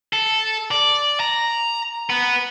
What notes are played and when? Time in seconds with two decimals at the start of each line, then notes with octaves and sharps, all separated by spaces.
0.13 A4
0.71 D5
1.20 A#5
2.10 B3